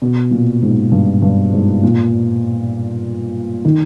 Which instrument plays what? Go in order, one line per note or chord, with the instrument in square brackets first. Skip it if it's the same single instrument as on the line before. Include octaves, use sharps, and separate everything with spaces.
[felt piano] B2
A#2
G#2
G2
G2
G#2
A#2
D#3